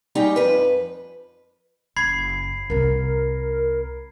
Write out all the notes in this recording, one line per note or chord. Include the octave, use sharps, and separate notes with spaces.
G3 C#4 D#4 G4 G5
F2 B4
F#1 B5 G#6 C7
C2 F4 A#4